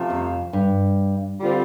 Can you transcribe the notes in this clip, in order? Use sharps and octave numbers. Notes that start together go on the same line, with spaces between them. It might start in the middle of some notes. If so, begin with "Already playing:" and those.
Already playing: C3 F3 A3 F4
F2
G2
D3 G3 C4 F4